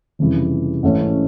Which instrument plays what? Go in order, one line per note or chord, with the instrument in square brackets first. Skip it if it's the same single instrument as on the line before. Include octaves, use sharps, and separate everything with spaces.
[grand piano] F1 F2 C#3 E3 G3
A1 G#2 E3 A3 C#4